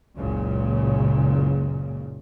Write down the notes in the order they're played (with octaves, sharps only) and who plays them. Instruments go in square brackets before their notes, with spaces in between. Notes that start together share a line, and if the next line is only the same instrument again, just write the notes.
[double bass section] F#1 C#2 A#2 C#3